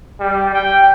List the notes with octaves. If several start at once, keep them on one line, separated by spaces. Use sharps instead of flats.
G3
G5